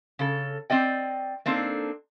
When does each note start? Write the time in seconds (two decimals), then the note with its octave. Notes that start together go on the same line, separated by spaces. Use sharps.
0.19 C#3 A4
0.70 C4 D5 D#5 G5
1.46 A#3 C4 D4 D#4 A4